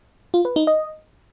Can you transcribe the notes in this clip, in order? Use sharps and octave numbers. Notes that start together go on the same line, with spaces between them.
F4
B4
D#4
D#5